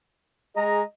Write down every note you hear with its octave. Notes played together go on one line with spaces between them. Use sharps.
G#3 G#4 D#5 A#5